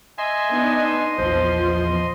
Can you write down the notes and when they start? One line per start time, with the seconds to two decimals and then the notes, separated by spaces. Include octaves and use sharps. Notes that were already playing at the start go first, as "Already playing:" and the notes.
0.18 D#5 E5 G#5 C6
0.51 B3 D4 D#4
1.18 A#1 E2 F3 C5